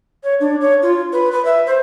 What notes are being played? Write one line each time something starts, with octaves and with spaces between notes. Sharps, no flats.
C#5
D4
C#5
F4
B4
B4
E5
C5